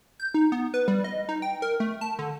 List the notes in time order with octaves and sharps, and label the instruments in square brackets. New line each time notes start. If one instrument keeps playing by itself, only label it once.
[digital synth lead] G6
D#4
B3
B4
G3
D#5
D#4
G5
A#4
A3
A5
D3